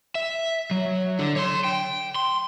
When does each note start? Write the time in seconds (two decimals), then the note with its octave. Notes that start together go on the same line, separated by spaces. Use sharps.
0.15 E5
0.71 F#3
1.19 D3
1.36 C#5 C6
1.64 G5
2.15 C6